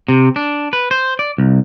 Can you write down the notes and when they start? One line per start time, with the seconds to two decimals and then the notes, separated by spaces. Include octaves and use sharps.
0.08 C3
0.36 D4
0.73 B4
0.91 C5
1.19 D5
1.38 C2